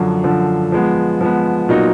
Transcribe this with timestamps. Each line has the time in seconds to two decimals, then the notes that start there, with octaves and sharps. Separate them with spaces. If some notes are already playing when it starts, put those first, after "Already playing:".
Already playing: F#2 D3 F3
0.24 F#2 D3 F3
0.72 F3 G#3 B3
1.21 F3 G#3 B3
1.69 A#2 F#3 B3 D#4 F#4